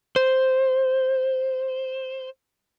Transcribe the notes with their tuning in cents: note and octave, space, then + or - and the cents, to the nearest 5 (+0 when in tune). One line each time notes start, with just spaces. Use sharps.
C5 +0